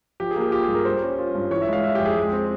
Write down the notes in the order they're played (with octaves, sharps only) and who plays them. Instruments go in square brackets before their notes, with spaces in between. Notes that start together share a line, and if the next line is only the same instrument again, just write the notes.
[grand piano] F3 G4
G#4
A#3
G4
F4 G4
G2 G#4
A#4
G3 C5
C#4
F4
G2
E3 C#5
E5
G#3 F5
E4 E5
F2 G4
G#4
G#3
C4